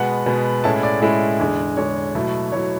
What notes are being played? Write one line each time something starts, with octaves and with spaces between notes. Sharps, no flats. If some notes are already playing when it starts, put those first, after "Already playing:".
Already playing: B2 G#3 B3 F#5
B2 G#3 B3
A2 G#3 C#4 E4 A5
D5
A2 G#3 C#4 E4 D5
E2 D3 G#3
E2 D3 G#3 C#5
B2 F#3 A3 E4
B2 F#3 A3 E4 C#5